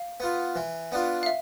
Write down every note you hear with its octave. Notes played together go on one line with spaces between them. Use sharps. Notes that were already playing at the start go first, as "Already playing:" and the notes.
Already playing: F5
B3 F4
E3
B3 D4 F4
F5
E5